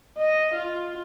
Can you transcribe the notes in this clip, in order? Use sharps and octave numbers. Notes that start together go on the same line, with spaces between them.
D#5
F4